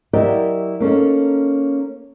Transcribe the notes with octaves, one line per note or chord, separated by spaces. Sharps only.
F#3 E4 G4 A#4 D5 D#5
A#3 C#4 D#4 A4